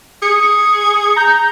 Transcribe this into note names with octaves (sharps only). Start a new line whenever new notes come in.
G#4 C#7
A#5 G6